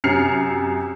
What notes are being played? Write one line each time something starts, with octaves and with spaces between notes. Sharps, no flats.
F#2 C3 F6 C7 C#7 F7